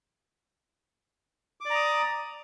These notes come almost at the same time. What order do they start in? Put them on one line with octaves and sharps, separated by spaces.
D6 D5 A#5 D#6